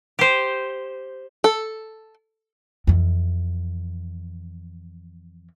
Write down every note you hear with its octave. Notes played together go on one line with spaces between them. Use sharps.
G4 C5
A4
F2 E3